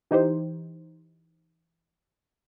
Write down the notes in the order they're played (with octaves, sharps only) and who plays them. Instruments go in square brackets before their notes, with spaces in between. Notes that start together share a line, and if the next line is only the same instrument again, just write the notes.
[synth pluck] E3 D#4 G4 C5